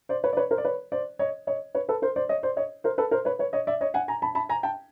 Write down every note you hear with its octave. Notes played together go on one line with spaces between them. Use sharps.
C5 D5
B4 C#5
D5
B4 C#5
A#4 C5
D5
B4 C#5
C5 D5
C#5 D#5
C#5 D#5
B4 C#5
A4 B4
A#4 C5
C5 D5
C#5 D#5
C5 D5
C#5 D#5
A#4 C5
A4 B4
A#4 C5
B4 C#5
B4 C#5
C#5 D#5
D5 E5
C#5 D#5
F#5 G#5
G#5 A#5
A5 B5
A5 B5
G#5 A#5
G5 A5